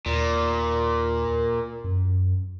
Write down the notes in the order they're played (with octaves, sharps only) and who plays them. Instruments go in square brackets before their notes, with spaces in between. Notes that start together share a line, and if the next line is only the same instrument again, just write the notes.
[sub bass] D#2 [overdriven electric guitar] A#2
[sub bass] F#2